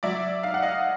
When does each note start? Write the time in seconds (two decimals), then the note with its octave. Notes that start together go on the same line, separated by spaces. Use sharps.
0.03 F#3 D5 E5
0.43 D#4 F5
0.54 F#5
0.63 D#5 F5